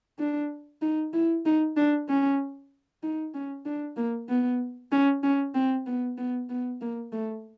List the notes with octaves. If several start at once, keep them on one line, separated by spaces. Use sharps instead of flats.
D4
D#4
E4
D#4
D4
C#4
D#4
C#4
D4
A#3
B3
C#4
C#4
C4
B3
B3
B3
A#3
A3